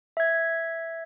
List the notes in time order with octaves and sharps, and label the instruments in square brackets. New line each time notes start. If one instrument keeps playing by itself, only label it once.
[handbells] E5 G#6